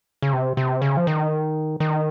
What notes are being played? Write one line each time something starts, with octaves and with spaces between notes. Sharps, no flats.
C#3
C3
C3
C#3
F3
D#3
D#3